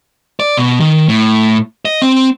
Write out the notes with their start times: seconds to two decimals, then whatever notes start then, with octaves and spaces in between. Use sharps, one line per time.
0.40 D5
0.57 B2
0.80 D#3
1.08 A2
1.85 D#5
2.02 C4